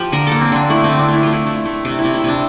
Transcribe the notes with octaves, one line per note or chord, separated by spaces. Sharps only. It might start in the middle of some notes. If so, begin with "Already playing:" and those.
Already playing: F3 G4
D3 A#4
A#3 A4
C4
D3 D4
A3 E4
C4
D3
D4
A3 E4
A3 F4
E4
A3
A3
C3 D4
E4
C3
E4
C3 D4